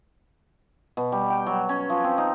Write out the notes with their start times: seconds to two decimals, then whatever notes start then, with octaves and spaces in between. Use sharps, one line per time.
0.97 B2
1.12 G3
1.30 G5
1.46 F#3
1.69 C#4
1.90 F3
2.04 C4
2.18 D#4